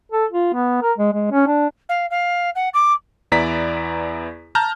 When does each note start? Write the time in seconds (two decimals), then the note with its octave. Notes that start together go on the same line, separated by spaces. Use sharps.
0.12 A4
0.32 F4
0.53 B3
0.82 A#4
0.98 G#3
1.13 G#3
1.31 C#4
1.47 D4
1.89 F5
2.10 F5
2.55 F#5
2.74 D6
3.32 E2 B3 E4 D5 A#5 B6
4.55 A5 A#5 F6 G6